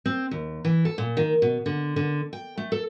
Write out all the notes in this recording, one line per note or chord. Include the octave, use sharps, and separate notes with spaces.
C4
D#2
E3
A4
A#2
D#3
B2
D3
D3
G5
A3
A4